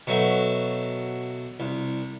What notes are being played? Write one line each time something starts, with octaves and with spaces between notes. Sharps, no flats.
B2 F#3 A3
C2